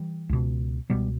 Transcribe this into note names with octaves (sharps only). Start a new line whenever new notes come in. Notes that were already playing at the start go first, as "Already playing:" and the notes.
Already playing: E3 G3
C#2 B2
C#2 B2 G3 B3